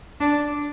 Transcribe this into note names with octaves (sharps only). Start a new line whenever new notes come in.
D4